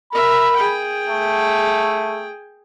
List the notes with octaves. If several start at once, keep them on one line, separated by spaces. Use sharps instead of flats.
A#4 E5 B5
G#4 G5
A3